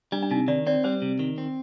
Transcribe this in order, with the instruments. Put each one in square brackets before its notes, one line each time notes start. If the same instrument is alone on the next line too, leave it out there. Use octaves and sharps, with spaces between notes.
[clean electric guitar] G3 [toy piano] D4
[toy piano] D4
[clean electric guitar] C3 [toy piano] D#4
[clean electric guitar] D#3 [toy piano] D5
[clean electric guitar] C4 [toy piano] D5
[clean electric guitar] G3 [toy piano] C5
[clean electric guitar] C3
D#3
C4